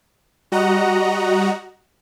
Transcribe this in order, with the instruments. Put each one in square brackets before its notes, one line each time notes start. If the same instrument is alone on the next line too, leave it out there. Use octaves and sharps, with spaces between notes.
[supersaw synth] G3 F#4 D#5 F#5 A#5